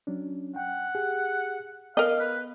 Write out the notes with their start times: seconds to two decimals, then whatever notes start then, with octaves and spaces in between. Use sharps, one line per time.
0.07 F#3 C#4 D4
0.56 F#5 G5
0.95 G4 G#4
1.97 B3 A#4 D#5 F5
2.19 B4